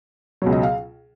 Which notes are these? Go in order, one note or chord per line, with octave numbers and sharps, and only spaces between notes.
C#2 B2 F#3
D#5
F5